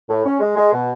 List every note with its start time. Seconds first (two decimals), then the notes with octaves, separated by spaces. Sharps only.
0.09 A2
0.25 C#4
0.40 G#3
0.56 G#3
0.72 B2